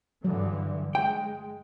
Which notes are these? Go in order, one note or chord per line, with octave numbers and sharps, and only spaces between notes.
G2 D3 E3 F#3
G#3 G5